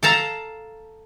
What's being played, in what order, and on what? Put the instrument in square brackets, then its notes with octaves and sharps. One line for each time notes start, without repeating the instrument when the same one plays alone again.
[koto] A4 F5 A5 A#5